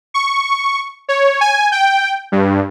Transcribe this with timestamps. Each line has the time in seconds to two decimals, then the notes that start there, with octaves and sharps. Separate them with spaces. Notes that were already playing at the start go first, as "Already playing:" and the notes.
0.14 C#6
1.09 C#5
1.41 G#5
1.72 G5
2.32 G2